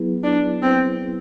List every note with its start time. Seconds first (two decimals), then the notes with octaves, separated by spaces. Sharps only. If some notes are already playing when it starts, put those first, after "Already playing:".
Already playing: F#3 B3 E4 G#4 B4
0.24 D4
0.62 C4